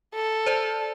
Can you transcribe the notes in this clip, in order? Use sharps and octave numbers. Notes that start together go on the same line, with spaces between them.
A4
C5 D5 A5